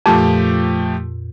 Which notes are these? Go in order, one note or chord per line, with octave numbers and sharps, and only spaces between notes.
F2 A#2 F3 A3 G4